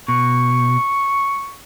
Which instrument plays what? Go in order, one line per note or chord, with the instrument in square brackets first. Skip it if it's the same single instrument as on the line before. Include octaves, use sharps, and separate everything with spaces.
[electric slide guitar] B2 [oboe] C#6